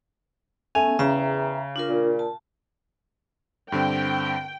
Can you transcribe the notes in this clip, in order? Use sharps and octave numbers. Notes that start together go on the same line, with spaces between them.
A3 B3 C#4 G#5
E2 C#3 E5 G5 A#5
D4 F4 A#4
A#2
A5
G2 D3 C4 G5